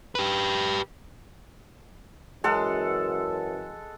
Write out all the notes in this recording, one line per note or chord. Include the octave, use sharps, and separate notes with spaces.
G4 B4
F#2 E3 G#3 A4 F#5